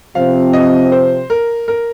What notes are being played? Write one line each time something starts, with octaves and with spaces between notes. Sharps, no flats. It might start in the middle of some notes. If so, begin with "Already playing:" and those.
C3 F3 C4 F5
D#5
C5
A#4
A#4